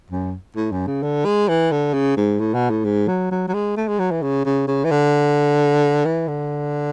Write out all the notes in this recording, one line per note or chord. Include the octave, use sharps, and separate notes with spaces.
F#2
A2
F#2
C#3
D3
G#3
E3
D3
C#3
G#2
A2
B2
A2
G#2
F#3
F#3
F#3
G#3
A3
G#3
F#3
E3
C#3
C#3
C#3
E3
D3
E3
D3